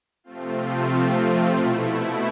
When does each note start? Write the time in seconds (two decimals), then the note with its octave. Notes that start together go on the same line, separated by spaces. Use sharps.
0.24 C3 F3 A3 C4 F4
1.51 B2 A3 E4